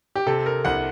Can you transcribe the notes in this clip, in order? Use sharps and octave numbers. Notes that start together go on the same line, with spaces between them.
G4
C3 A4
A#4
C2 F#5